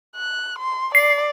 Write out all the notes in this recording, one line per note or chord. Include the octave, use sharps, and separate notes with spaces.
F#6
C6
D5 C7